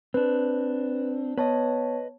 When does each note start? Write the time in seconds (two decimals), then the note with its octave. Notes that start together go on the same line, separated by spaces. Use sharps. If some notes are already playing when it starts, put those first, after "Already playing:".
0.14 C4 D4 B4
1.38 B3 B4 C#5 D#5 A5